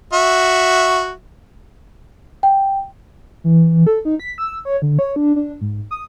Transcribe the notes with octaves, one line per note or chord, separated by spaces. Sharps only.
F#4 E5
G5
E3
A4
D#4
B6
E6
C#5
D3
C#5
D4
D4
G#2
D#6